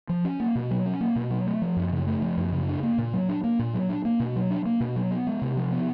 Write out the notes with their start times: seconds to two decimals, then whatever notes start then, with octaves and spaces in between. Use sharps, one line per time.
0.09 F3
0.25 C#4
0.40 A#3
0.55 B2
0.71 F#3
0.86 C#4
1.01 A#3
1.16 B2
1.31 F#3
1.47 A3
1.62 F3
1.77 F#2
1.92 C#3
2.07 A3
2.22 F3
2.37 F#2
2.52 C#3
2.69 D4
2.83 A#3
2.98 A#2
3.13 F#3
3.29 D4
3.44 A#3
3.59 A#2
3.74 F#3
3.89 D4
4.05 A#3
4.20 B2
4.36 F#3
4.50 D4
4.66 A#3
4.80 B2
4.96 F#3
5.11 B3
5.27 G#3
5.42 C3
5.57 F3
5.72 B3